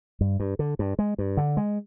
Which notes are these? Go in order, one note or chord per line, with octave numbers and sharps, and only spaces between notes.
G2
G2
D3
G2
G#3
G2
D3
G#3